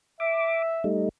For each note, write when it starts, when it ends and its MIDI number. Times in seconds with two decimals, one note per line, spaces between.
0.20 0.86 76
0.20 0.62 86
0.84 1.09 55
0.84 1.09 57
0.84 1.09 63